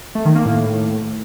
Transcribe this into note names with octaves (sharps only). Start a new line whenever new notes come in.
A3
D#3
A#3
A2